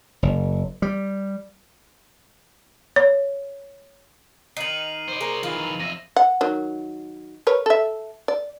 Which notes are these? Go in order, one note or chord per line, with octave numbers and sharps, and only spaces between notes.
F#1
G3
C#5
D#3 D#4 C7 D#7 F#7
C5 D5
A#3 G#4 A#4 A#5
D#3 E3 F4
F2 E5 A#6 D#7
F#5
D#3 F#3
A#4 B4 C#5
A4 E5
D5